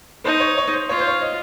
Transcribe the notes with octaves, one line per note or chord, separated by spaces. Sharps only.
D#4 C5
C#5
C#5
C5
F4 C#5
C5
C#5
D#5